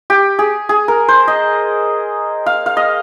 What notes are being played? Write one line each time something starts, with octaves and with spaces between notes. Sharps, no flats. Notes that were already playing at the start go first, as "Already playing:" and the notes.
G4
G#4
G#4
A#4
C5
D#5
F5
F5
D#5